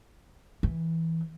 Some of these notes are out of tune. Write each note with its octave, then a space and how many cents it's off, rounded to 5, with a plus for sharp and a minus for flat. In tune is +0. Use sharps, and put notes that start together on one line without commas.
E3 -10